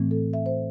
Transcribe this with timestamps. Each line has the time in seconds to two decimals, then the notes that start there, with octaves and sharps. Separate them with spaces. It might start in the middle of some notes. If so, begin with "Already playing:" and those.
Already playing: A2 E3 A3 C4
0.11 A4
0.33 E5
0.46 C5